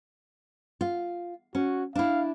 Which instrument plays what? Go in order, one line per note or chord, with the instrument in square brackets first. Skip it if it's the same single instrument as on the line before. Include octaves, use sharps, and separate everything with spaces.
[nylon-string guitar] F4
[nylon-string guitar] C#4 [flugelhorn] F#4
[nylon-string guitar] D4 E4 [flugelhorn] F5